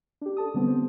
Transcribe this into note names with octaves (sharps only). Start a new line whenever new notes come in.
D4 G4
D4 A4 A5 D#6
D3 G3 B3 C4
C5